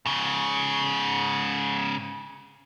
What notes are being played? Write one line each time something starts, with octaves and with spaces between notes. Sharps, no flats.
G#2 C#3